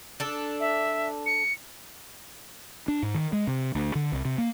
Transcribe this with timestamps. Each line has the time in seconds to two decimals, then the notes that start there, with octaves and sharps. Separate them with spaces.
0.20 D4 A4
0.60 E5
1.26 C#7
2.88 D4
3.03 G#2
3.14 D#3
3.33 G#3
3.47 C3
3.75 D2
3.95 D3
4.12 C2
4.25 C3
4.38 A#3